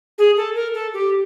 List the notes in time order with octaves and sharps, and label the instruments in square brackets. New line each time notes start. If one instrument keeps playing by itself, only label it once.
[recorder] G#4
A4
A#4
A4
G4